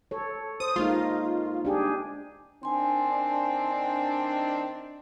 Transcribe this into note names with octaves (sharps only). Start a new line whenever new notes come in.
A4 C#5
C5 D#6
G#3 A#3 D#4 F4
D4 G4 G#4
D#3 C4 D4 G#5 C6